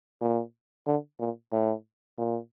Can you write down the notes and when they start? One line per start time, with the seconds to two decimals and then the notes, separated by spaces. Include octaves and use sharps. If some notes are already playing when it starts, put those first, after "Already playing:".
0.21 A#2
0.87 D3
1.20 A#2
1.52 A2
2.18 A#2